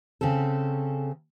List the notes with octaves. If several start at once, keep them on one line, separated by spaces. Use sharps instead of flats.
C#3 C4 C#4 A4